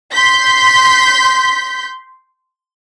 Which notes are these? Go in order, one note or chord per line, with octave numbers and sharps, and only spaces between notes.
C6 G6 B6